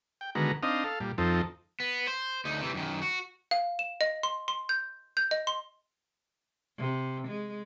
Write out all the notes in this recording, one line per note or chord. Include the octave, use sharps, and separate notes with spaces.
G5
D3 D#3 G#3 B3 F#4 A#4
C4 D4 D#4 D#5 F5
A4 F5
A#2 G3
F2 F3 C4 D#4 A4
B3
C5
D2 D#4
C3 E3
F#2 D#3
F#4
F5
E7
D#5
C6
C6
G6
G6
D#5
C6
C3
G#3